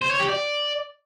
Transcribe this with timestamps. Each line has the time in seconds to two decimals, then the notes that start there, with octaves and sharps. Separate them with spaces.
0.02 C5
0.11 C#5
0.19 G4
0.28 D5